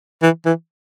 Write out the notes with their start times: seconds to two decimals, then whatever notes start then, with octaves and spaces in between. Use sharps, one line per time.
0.23 E3
0.46 E3